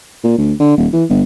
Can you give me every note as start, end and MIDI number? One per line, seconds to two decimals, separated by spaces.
0.24 0.34 46
0.38 0.53 38
0.59 0.76 50
0.77 0.87 27
0.93 1.04 52
1.09 1.22 31